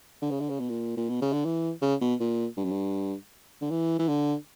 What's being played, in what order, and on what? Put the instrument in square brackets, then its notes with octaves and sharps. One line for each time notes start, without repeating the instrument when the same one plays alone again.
[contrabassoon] D3
C#3
D3
C#3
B2
A#2
A#2
B2
C#3
D3
E3
C#3
B2
A#2
G2
F#2
G2
D3
E3
E3
D3